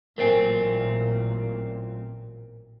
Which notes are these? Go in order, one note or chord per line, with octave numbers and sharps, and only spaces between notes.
A1 A#2 F#3 A3 C4 A#4 C5 G#5